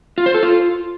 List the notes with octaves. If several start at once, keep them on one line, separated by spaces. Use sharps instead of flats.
F4
C5
A4
F4